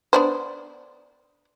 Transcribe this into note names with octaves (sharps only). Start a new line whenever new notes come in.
B3 D4 C5